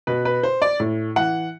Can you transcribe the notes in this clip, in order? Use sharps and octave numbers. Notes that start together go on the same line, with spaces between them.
B2 B4
B4
C5
D5
A2
E3 F#5